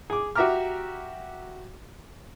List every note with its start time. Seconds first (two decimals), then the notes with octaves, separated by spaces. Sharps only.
0.10 G#4 D6
0.35 F#4 G4 E5 A#5 D6 F6